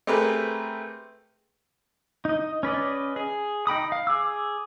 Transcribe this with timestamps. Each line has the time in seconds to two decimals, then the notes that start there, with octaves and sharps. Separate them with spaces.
0.07 A3 C4 G4 G#4 A#4 B4
2.25 D#4 D#5
2.63 C#4 B4 D5 D#5
3.16 G#4
3.67 D#4 G5 B5 D#6
3.92 F5
4.07 G#4 D6 E6